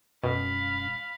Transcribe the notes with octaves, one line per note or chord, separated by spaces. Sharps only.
E1 F#2 B2 F5 B5